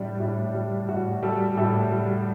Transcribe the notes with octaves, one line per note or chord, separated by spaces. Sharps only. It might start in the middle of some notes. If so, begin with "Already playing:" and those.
Already playing: A2 G3 D4
A2
G3
A2 F#4
G3 A4
A2 A4
G3